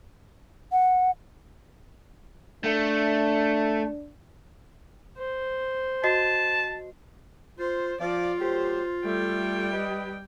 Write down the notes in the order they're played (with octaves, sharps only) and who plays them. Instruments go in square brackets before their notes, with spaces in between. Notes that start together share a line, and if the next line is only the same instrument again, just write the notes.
[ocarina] F#5
[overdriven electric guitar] A3 [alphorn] D4
[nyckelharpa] C5
[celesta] F#4 D#5 C7 [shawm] A5
[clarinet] F4 [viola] C5
[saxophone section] F3 [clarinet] F4 [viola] D5
[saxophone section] F#3 A3 G4 [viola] C5
[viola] G3 G5 [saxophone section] A3
[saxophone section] G4 B4 D#5